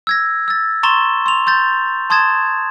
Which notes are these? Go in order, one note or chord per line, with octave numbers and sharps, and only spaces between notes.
E6 G#6 A#6
E6 A6
A#5 C6 C#6 A6 E7 G7
C6 F7
C6 G6 A6
A5 C6 D#6 G#6 A6 E7